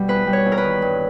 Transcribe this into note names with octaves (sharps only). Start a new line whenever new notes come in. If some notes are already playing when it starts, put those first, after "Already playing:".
Already playing: B2 G3
E2 B4
G3
C#5
E2
A#4
B4
D#3
G2